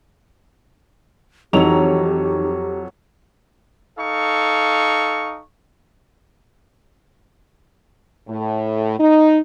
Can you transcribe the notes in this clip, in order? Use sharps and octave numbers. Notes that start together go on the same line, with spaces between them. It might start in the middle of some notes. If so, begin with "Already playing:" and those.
F2 E3 F#3 D#4 G4 C#5 F7
D#4 A4 F5 C#6
A2
D#4